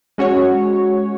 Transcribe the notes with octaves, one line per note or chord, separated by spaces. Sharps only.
G#3 C#4 F#4 C#5